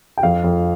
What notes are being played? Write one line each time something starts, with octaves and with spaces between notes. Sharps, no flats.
G5
F2 F5
F2